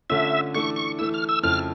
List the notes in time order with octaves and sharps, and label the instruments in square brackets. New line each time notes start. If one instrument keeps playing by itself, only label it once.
[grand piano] D3 A3 C#4 F4 [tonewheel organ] E5
[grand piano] E3 A3 D4 [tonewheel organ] C#6
[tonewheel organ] C#6
[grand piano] E3 A3 E4 [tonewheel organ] E6
[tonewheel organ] F6
E6
[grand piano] F2 C#3 F3 A3 E4 [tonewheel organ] F6